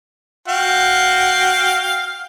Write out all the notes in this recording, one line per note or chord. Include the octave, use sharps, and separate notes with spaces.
F#4 F5 G5